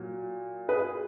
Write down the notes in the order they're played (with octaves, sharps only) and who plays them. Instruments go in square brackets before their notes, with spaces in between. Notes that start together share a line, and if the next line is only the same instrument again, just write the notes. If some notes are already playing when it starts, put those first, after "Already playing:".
Already playing: [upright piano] A#2 F#3
G#4 B4